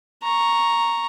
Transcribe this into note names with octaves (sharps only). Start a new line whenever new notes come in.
A#5 C#6